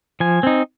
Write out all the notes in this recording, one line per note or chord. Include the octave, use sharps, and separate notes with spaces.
F3 G#5
C4 D#4